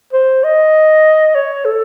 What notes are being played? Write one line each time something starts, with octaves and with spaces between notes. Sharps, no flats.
C5
D#5
C#5
A4